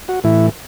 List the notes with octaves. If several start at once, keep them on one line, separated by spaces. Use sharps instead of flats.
F#4
A2 E3 E4